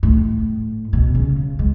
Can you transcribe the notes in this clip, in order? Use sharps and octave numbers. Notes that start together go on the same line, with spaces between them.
A2
B2
C#3
G#3